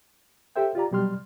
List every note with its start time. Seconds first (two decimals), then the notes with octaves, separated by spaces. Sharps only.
0.56 G4 A4 C5 E5 G5
0.75 F4 G4 D5 A#5
0.91 B2 F#3 G3 D5 C6 F6